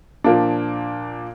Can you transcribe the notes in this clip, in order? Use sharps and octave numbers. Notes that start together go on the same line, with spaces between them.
A#2 F3 A#3 D4